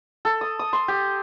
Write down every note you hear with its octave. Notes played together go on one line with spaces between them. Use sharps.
A4
D#6
D#6
C6
G4